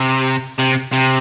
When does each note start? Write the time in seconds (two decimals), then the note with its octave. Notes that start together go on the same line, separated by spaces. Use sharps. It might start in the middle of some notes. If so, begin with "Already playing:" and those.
Already playing: C3
0.59 C3
0.93 C3